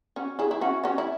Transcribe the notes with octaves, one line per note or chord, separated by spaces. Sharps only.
C#4 F#4
E4 G#4
E4
C#4 F#4
C#4 F#4
E4